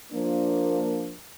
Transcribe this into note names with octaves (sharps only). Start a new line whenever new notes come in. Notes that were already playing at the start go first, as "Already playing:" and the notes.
F3 A#3 D4